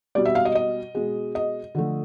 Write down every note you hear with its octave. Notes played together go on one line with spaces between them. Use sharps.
B2 G3 D5
E5
F5
D#5
D#5
B2 G#3
D#5
D3 F3 A3